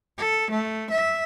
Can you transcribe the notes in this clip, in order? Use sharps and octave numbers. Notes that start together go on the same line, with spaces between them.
A4
A3
E5